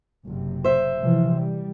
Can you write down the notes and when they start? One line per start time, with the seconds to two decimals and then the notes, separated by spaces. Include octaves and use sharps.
0.24 F#1 C3
0.64 C5 E5
1.01 C3 E3 F3
1.35 G3